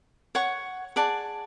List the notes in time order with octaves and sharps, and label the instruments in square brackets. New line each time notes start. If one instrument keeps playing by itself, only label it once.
[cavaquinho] C#5 F#5 C#6
G#4 D5 F#5 A5